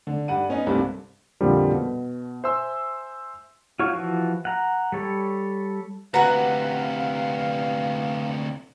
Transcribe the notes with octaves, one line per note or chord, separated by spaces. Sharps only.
D3
G2 F#5 D#7
B3 C#4 D#4
C2 G2 A3 A#3 C4
F2 A#2 D3 F3 G3
B2
C5 E5 G#5 C6 E6
F4 F#4 C#5 C#6
E3 F3 F#4
F#5 A#5
G3 A4 C#5
D2 C3 F#4 B4 F5 F#5 A#5